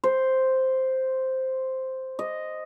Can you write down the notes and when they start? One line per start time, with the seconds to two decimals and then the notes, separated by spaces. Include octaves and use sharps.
0.04 C5
2.19 D#5